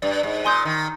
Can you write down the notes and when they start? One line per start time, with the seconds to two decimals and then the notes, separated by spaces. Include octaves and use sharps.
0.02 G2 D5
0.23 G#2
0.44 A#2 G#5 C6 D#6 G6
0.65 D#3